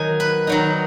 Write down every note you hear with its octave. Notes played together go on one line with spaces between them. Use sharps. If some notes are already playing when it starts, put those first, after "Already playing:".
Already playing: D#3 F#3 D#4 G#5
B4
D#3 F#3 D#4